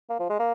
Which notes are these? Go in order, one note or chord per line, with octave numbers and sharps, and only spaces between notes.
A#3
F3
G#3
A#3